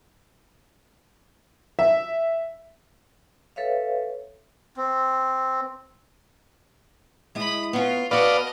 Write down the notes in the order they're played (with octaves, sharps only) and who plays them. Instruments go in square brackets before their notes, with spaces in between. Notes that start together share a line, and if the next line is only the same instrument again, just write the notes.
[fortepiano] E5
[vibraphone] A4 B4 C#5 E5 F5
[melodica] C4
[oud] G#3 E4 [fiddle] B5 D#6
[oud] B3 C#4 [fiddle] F4
[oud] B3 F#4 [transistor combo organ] B4 D5 F5 [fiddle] D#5 A5